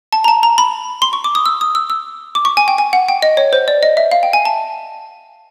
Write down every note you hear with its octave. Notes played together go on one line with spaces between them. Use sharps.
A5
A#5
A5
A#5
B5
C6
C#6
D6
D#6
E6
D#6
E6
E6
D6
C#6
G#5
G5
G#5
F#5
G5
D#5
C#5
C5
D5
D#5
E5
F5
G5
G#5
A5